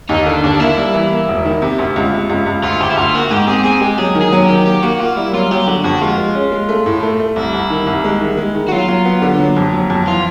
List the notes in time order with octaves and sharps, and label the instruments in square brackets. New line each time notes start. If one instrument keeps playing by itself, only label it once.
[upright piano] D#2 [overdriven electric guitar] D#4
[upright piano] D3 [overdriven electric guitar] D4
[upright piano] D#2 [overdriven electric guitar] D4
[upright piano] A#3 [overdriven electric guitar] E4
[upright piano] G3
E3
A#3
E1
D#3
C3
D2
C#2
C3
C#2
C#2
[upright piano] D2 [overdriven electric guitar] F4
[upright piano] D2 [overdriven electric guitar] G4
[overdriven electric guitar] E4
[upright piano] D2 [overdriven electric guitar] F4
[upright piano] A#3 [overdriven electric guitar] F#4
[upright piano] G#2 [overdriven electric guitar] G4
[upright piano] C4 [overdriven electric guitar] G#4
[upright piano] C4 [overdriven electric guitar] G#4
[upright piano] G#3 [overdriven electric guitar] G4
[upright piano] F#3 [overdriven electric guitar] G#4
[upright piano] D#3
[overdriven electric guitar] G#4
[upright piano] F#3
[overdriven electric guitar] G4
[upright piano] D#3
[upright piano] A#3 [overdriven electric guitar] G4
[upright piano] A#3 [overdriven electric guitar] F#4
[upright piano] A#3 [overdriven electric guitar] F4
[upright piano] G3 [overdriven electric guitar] E4
[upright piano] F#3 [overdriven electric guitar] F4
[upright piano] F#3 [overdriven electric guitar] G4
[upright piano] D3 [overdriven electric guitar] F#4
[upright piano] F2 [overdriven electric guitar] F#4
[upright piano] G#3 [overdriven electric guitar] F4
[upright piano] G#3
C#4
G#3
A3
A2
A3
A3
[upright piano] C2 [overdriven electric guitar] E4
[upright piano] C2
D#3
C2
G#3
D#3
G#3
D#3
[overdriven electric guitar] F#4
[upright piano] F#3 [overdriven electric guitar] F4
[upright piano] F#3
B3
D3
F#3
F2
F#3
F2
[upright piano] E3 [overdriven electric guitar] F4